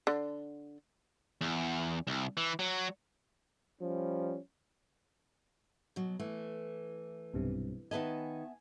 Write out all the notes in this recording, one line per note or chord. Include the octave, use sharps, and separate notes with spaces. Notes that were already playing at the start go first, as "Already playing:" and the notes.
D3
E2
C2
E3
F#3
F3 G3 C#4
B2 F#3
E3 A3
B1 G2 C3
D#3 B3 B4 D#5 E5 G#5 A5